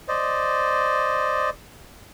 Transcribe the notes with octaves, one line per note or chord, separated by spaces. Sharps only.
C5 D5 D#5